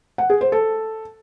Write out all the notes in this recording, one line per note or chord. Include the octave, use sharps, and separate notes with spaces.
F#5
G#4
C5
A4